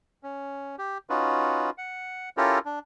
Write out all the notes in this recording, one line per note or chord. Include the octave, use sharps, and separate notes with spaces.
C#4
G4
C#4 D#4 F4 F#4 B4
F#5
C#4 E4 F4 G4 A4 A#4
D4